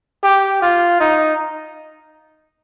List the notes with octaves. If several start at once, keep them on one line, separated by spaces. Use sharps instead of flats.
G4
F4
D#4